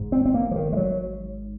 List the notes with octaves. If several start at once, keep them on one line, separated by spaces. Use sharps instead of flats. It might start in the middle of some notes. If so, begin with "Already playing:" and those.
Already playing: G#1 G#2
C4
C4
A#3
F3
D#3
G#3
F#3